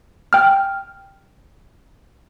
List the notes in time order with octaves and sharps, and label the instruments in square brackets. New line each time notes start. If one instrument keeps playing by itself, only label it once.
[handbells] G5 F6